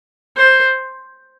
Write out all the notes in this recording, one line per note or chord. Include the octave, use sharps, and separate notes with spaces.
C5